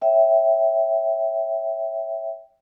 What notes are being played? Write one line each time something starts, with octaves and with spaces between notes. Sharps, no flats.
C#5 E5 G5